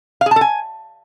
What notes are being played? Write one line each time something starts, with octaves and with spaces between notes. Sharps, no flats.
F5
G#4
A5
A4
G#5